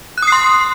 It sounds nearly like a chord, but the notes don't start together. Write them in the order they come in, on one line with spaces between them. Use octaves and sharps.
F#6 D#6 C7 C6